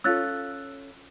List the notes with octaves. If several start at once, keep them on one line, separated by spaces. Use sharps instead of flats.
C#4 F4 A4 E6 F#6 A6